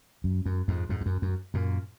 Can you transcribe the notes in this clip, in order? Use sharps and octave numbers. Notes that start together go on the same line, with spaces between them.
F#2
F#2
F2 G#2
F2 G#2
F2
F#2
F#2
F#2 A#2